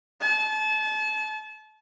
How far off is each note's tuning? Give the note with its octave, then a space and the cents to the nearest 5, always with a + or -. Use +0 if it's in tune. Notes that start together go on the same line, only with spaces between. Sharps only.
A5 -35